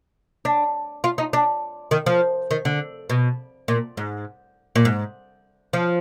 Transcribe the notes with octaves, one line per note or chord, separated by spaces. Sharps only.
D4
F4
D#4
D4
D#3
F3
D#3
D3
B2
A#2
G#2
A#2
G#2
F3